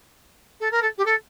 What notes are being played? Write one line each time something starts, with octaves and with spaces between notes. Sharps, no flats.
A4
A#4
A4
G4
A4